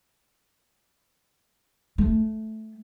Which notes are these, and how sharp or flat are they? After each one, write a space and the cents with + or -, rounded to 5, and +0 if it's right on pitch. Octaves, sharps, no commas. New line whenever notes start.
A3 -10